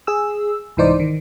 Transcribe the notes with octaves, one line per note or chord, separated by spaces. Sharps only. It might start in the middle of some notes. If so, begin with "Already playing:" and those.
G#4 E6
C2 G#2 E3 D#4 C5 D5
D#3